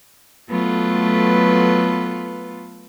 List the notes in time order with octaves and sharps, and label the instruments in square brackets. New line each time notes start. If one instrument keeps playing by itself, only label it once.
[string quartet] F#3 A3 B3 F4 A4 B4